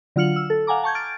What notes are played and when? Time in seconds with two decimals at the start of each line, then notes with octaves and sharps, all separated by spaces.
0.16 D3 F#3 F4 F6 C#7 F#7
0.36 E6
0.50 A4
0.67 F5 F#5 G#5 A#5 D6
0.83 A5 C#6 G6 G#6
0.95 F6 A6 D7